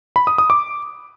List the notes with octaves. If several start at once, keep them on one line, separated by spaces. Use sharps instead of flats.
B5
D#6
D#6
D6